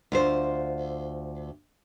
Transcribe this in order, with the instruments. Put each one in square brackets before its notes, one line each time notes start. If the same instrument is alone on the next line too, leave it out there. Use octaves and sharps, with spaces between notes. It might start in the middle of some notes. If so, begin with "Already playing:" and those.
[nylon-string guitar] D2 F4 C5